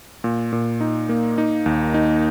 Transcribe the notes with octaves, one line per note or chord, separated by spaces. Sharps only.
A#2
A#2
D#4
A#3
D#4
D#2
D#4